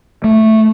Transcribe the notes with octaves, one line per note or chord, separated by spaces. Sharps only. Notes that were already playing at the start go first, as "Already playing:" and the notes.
A3